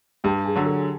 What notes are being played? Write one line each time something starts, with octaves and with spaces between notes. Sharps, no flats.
G2 G4
G#4
D3 F#3
A4